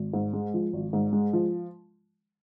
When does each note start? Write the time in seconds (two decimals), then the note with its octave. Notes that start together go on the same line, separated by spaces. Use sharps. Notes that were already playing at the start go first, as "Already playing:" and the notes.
Already playing: G#1
0.13 G#2
0.33 G#3
0.54 F3
0.73 G#1
0.93 G#2
1.13 G#3
1.33 F3